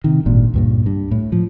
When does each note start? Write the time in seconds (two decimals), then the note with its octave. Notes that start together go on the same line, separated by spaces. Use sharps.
0.04 C3 D#3
0.26 G#1 G2 A#2
0.54 C#2 G2 A#2
0.86 G2
1.11 A2
1.32 F3